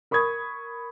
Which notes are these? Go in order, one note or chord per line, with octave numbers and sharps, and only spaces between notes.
A#4 B5 C#6 D#6 G#6